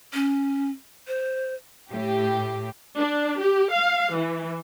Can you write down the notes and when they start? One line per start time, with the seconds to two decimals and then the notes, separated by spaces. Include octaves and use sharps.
0.14 C#4
1.08 C5
1.90 A2 G4
2.97 D4
3.41 G4
3.72 F5
4.14 E3